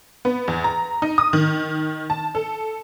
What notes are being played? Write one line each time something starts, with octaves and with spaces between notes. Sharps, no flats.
B3
E2
A#5
D#4
D#6
D#3
A5
A4